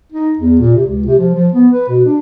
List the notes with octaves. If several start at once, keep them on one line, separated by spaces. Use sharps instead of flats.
D#4
E2
A#2
C3
C#2
C3
F3
F3
B3
B4
B2
D4